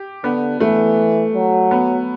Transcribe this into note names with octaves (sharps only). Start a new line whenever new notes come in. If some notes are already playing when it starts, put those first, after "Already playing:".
Already playing: G4
D3 B3
E3 A3
F#3
B3